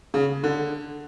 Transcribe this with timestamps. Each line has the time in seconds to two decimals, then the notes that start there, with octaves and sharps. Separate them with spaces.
0.14 C#3
0.44 D3